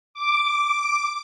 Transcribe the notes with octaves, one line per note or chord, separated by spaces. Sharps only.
D6